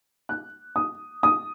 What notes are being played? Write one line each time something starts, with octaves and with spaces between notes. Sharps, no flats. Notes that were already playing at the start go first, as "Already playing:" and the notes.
F#6
D#6
D#6